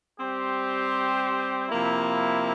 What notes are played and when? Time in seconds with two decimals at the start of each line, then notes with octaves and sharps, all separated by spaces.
0.19 G3 C4 G4 C5
1.69 C3 F3 A#3 E4